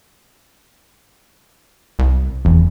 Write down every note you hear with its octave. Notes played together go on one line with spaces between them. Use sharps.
C2
F#1 E2